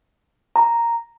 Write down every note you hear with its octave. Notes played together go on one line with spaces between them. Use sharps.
A#5